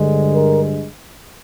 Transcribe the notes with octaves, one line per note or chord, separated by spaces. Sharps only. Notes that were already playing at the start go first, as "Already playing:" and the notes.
Already playing: G2 D3 G#3
A#4